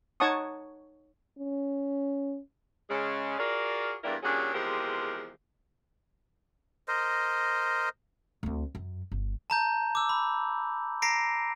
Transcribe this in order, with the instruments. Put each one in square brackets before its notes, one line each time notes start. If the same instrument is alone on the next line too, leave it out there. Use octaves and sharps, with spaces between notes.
[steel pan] D#4 C#5 F#5 A5 C#6 D#6
[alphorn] C#4
[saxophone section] C#3 G#3
F4 F#4 G#4 A#4 D5
E2 G2 G3 A#3 E4 A#4
A#2 C#3 F#3 D4 G4 G#4
E2 C3 F3 G#3 G4 A#4
[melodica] A#4 C5 D#5
[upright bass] D2 C4
F#2
G1
[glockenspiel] A5 A#5 G6
D6 E6
B5
A#5 A#6 C7 D7